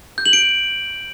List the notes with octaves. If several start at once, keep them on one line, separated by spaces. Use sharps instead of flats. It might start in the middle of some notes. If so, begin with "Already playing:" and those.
G6
F#7
D7